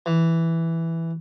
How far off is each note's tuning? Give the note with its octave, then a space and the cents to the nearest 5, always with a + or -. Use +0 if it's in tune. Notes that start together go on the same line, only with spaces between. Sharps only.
E3 +0